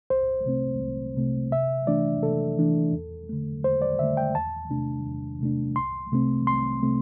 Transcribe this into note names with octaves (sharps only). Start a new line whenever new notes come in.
C2 C5
C3 A3 C4
C2
C3 A3 C4
C3 E5
E3 A3 D4 D5
C3 A4
E3 A3 D4
E2
D3 A3
E2 C5
D5
D3 A3 E5
G5
E2 A5
C3 A3 D4
E2
C3 A3 D4
C2 C6
C3 A3 C4
C2 C6
C3 A3 C4